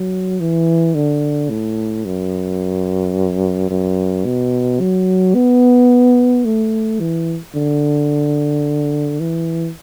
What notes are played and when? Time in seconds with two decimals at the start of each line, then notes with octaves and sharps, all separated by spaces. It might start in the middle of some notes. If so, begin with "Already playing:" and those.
Already playing: F#3
0.40 E3
0.95 D3
1.50 A2
2.05 F#2
3.70 F#2
4.25 B2
4.80 F#3
5.35 B3
6.45 A3
7.00 E3
7.55 D3
9.20 E3